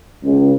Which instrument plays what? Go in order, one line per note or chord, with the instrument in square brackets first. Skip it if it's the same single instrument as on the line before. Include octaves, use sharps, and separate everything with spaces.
[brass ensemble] C#2